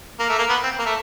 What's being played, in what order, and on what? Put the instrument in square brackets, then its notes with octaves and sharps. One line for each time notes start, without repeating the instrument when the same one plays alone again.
[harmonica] A#3
A3
A#3
B3
C4
A#3
A3